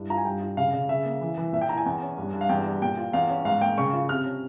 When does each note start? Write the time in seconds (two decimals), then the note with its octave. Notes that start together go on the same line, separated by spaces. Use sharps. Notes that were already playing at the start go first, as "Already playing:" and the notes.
Already playing: G2 E4
0.10 F4 A#5
0.18 G#5
0.25 G2 G5
0.41 F4
0.57 C#3 F5
0.74 C#3
0.89 C#3 E5
1.05 A#3
1.21 E3
1.38 E3
1.53 A#2 E5
1.61 G5
1.69 E4 A#5
1.78 G#5
1.86 E2
2.02 C#4
2.18 G2
2.34 G2
2.41 F5
2.49 E2 G5
2.65 G3
2.82 A#2 G5
2.97 F4
3.13 E2 F5
3.29 C#4
3.45 G#2 F5
3.61 A#3 G5
3.78 C#3 C#6
3.93 F4
4.09 C3 F6
4.25 C#4